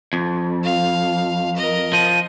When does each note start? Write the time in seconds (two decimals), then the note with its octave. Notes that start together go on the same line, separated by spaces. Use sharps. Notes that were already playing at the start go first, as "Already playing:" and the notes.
0.13 F2
0.64 F5
1.56 A#4 D#5
1.93 F3 D#7